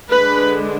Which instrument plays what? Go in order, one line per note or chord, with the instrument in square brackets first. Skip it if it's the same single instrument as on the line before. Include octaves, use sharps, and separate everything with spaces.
[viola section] D3 G#3 D4 B4